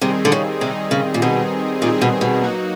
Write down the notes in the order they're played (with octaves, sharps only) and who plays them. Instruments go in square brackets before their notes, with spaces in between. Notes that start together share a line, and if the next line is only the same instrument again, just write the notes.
[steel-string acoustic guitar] C3 [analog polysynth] D#3 G3 C4 D#4 G#4
[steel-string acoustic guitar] D3
C#3
[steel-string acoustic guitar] C3 [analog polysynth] D#3 G3 C4 D#4 G#4
[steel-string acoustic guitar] C#3
A#2
[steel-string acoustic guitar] B2 [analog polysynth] D#3 G3 C4 D#4 G#4
[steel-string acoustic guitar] A#2 [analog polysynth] D#3 G3 C4 D#4 G#4
[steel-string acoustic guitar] B2
B2
[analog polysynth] F#3 A#3 D#4 F#4